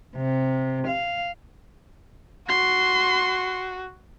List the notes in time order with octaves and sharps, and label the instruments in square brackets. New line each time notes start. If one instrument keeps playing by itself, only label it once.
[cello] C3
F5
[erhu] F#4 [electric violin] C6